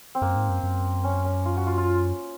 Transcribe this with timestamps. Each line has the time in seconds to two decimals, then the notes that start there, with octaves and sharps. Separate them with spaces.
0.15 C4
0.22 F#2 A#3
0.36 G#2
0.49 F#2
0.63 F#2
1.04 C#4
1.25 C#4
1.45 F4
1.57 F#4
1.67 F4
1.78 F4